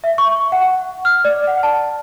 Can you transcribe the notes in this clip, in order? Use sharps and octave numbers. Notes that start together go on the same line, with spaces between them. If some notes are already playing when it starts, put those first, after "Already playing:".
E5
C#6
F#5
F6
D5
F#5
A5